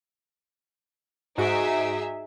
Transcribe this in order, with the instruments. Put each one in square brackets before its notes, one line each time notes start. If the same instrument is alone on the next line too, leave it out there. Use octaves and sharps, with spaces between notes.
[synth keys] G#2 F#4 D7 [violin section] D#4 G#4 E5